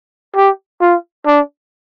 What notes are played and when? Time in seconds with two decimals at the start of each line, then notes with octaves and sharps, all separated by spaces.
0.36 G4
0.81 F4
1.27 D4